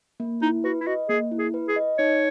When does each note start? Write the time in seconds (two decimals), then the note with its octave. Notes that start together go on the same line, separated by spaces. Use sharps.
0.20 A#3
0.42 D#4 E4
0.64 F#4 B4
0.81 E4
0.87 F#4 D#5
1.09 A#3 G#4
1.32 E4
1.39 G#4
1.54 B4
1.68 G#4
1.76 D#5
1.98 D#4 C#5